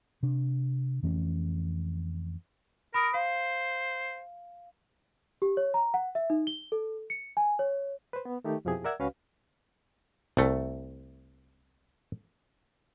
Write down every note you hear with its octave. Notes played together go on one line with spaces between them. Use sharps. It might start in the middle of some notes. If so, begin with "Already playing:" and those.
C3 D4
F2 E3 A3 C#4
A#4 B5 D#6 D7
C5 F5
G4
C#5
A#5
F#5
E5
D#4
G7
A4
C#7
G#5
C#5
B4 C5
B3
D#3 A3 D#4 G4
F2 B2 F3 E4 G4 G#4
A#4 D5 E5 F#5 E6 G#6
C#2 C#4 F#4 B4 F5
C2 A3